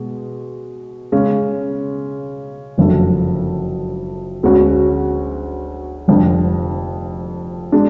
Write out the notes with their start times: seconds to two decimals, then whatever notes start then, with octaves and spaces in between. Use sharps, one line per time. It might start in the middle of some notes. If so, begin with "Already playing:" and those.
Already playing: B2 G#3
1.12 C#3 G#3 C#4
2.78 F#1 F2 D3 F#3 A3
4.43 D2 D3 G#3 C#4 F#4
6.08 F1 F2 D3
7.72 G#3 D4